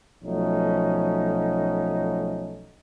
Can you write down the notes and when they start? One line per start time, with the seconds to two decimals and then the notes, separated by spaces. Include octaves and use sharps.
0.23 B1 F3 F#3 A3 C#4 D#4